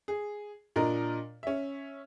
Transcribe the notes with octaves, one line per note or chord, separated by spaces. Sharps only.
G#4
A#2 D4 A#4 D#5
C#4 E5